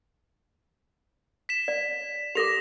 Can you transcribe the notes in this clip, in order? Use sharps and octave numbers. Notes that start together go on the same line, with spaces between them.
B6 E7
D5
G4 A4 D6 A#6 F7